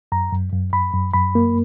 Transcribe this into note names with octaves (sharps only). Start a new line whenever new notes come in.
F#2 A#5
F#2
F#2
F#2 B5
F#2
F#2 B5
A#3